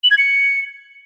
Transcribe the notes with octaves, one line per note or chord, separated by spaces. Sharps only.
F#7
G#6
C#7